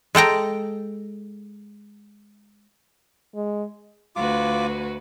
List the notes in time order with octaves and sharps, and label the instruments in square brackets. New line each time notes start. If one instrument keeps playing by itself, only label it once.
[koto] G#3 A4 G5 A#5
[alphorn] G#3
[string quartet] D2 F#4 B4 [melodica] F4 D6